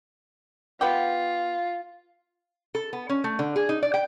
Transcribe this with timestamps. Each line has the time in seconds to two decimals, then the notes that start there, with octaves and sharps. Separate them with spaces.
0.81 B3 F4 G4
2.75 A4
2.93 B3
3.09 C#4
3.24 A3
3.39 D3
3.56 G#4
3.69 D#4
3.83 D5
3.94 G5